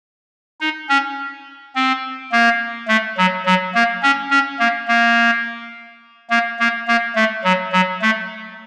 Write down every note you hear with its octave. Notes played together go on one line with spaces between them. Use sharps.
D#4
C#4
C4
A#3
A3
F#3
F#3
A#3
C#4
C#4
A#3
A#3
A#3
A#3
A#3
A3
F#3
F#3
A3